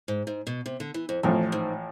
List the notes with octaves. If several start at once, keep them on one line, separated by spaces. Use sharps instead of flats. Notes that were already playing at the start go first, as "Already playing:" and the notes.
G#2
G#2
B2
C3
D3
E3
F2
A1 F2 A2 F3
G#2